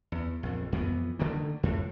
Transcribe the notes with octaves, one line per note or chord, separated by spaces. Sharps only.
E2
A#1 F2
F2 E3 B3
D3 D#3 A3 A#3
F2 A2